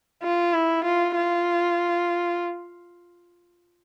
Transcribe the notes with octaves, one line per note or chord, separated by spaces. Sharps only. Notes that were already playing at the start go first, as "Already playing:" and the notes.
F4
E4
F4
F4